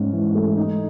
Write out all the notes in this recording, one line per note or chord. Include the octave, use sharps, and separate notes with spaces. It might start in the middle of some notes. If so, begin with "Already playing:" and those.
Already playing: G#2 C#4
E3
A3
D#4